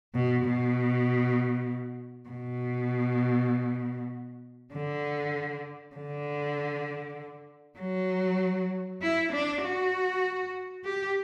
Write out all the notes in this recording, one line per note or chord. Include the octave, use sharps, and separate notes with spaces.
B2
B2
B2
D3
D3
F#3
E4
D4
F#4
G4